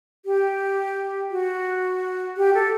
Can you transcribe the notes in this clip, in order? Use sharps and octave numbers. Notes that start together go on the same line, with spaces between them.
G4
F#4
G4
A4